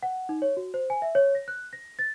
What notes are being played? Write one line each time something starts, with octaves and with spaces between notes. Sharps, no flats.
F#5
D#4
C#5
F#4
C5
G#5
E5
C#5
A#6
F#6
A#6
A6